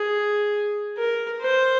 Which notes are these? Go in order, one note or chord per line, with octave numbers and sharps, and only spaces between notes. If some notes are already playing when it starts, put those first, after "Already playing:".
Already playing: G#4
A#4
C5